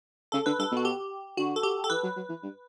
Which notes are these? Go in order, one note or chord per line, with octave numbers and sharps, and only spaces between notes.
C#3 A4
D3 B4
G2 A4
B2
F#4
G4
D3 F#4
A4
G4
A4
E3 B4
F#3
F#3
E3
G2